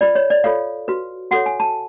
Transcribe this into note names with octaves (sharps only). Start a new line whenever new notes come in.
F4 B4 D5
C#5
D5
F4 A4 C#5 F5
F#4 B4
F#4 A4 C#5 F#5
G#5
A5